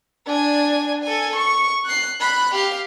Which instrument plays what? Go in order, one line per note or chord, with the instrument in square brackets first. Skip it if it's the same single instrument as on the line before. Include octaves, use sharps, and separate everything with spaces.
[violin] D4 G#5
A4 G#5
C#6
F#6 C7
B5 F#6
G4 F5